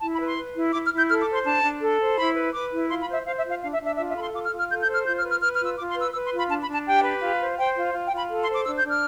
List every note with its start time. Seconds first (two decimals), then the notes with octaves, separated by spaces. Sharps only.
0.01 E4 A5
0.14 B5
0.19 B4
0.25 C6
0.37 B4
0.55 E4
0.73 E4 D6
0.86 F6
0.92 E4 G6
1.09 A4 F6
1.21 D6
1.28 C5
1.34 C6
1.45 D4 A5
1.63 D4
1.82 A4
1.99 C5
2.17 E4 B5
2.35 B4
2.53 B4 D6
2.71 E4
2.89 F4 C6
3.01 B5
3.08 C5
3.13 E5
3.25 C5 F5
3.37 E5
3.44 F4
3.49 F5
3.61 D4 F5
3.73 E5
3.79 D4
3.85 E5
3.97 F4 E5
4.09 E5
4.15 A4 B5
4.21 C6
4.34 F4 D6
4.45 F6
4.51 F4
4.58 F6
4.69 A4 G6
4.81 G6
4.87 C5
4.94 F6
5.05 F4 G6
5.18 F6
5.24 B4
5.30 F6
5.42 B4 F6
5.54 F6
5.59 F4
5.65 E6
5.77 F4 D6
5.89 C6
5.95 B4
6.02 E6
6.13 B4 E6
6.26 C6
6.31 F4
6.37 B5
6.49 D4 A5
6.62 B5
6.68 D4 A5
6.86 G4 G5
7.03 B4
7.21 F4
7.39 C5
7.57 C5 G5
7.76 F4
7.94 F4
8.06 G5
8.12 F4
8.17 B5
8.30 A4
8.42 C6
8.48 C5
8.54 D6
8.66 D4 E6
8.78 G6
8.83 D4
8.90 F6